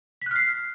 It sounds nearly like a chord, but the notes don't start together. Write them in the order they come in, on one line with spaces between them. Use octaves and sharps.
B6 F#6 F6 C7